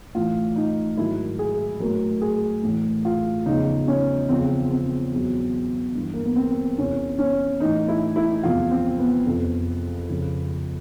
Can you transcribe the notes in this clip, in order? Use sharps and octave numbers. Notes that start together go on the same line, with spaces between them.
A2 E3 F4
D#4
G#2 D#3 F#3 E4
G#4
A2 F#3 A#4
G#4
A2 E3
F4
E2 C#3 F3 D#4
C#4
E2 C#3 F3 C4
C4
E2 B2 F#3
G2 E3
A#3
B3
C4
E2 C3 E3 C#4
C#4
A2 E3 D#4
E4
E4
E2 C3 F3 F4
C4
B3
F2 C3 F3
F2 C#3 F3